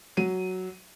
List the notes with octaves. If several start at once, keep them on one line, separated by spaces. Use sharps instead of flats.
F#3 D#7